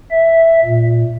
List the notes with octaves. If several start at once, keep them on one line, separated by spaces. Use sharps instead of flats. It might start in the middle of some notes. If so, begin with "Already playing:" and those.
E5
A#2